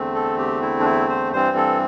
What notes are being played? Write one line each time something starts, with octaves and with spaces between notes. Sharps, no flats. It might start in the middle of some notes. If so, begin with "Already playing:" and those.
Already playing: E2 D3 A3 C4
A4
G4
E4
D4
E4
C5
G2 E3 G3 C4 C5
A4